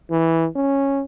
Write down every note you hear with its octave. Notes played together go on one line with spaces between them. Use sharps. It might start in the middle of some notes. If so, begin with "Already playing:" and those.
E3
C#4